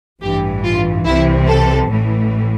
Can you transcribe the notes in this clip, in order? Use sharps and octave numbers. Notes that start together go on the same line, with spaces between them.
A1 G2 E3 G4
F4
C2 C3 E3 E4
A4
A1 A2 E3